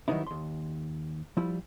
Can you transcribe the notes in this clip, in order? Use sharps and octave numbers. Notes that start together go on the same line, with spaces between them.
D#3 F#3 G3 B3 D#4 E4
D#2 C6
F3 G3 E4